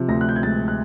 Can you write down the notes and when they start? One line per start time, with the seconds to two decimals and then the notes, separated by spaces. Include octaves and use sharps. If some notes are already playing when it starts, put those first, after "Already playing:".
Already playing: C3 F3
0.08 D2 A#6
0.21 F#6
0.29 G6
0.36 G#6
0.43 G#3 A6
0.68 F#6